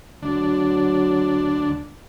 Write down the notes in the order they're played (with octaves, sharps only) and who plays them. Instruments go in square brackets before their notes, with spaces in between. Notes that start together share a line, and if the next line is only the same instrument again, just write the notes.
[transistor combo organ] D2 D4 [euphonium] F#3